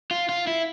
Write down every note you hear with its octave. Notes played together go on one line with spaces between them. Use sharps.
F4
F4
E4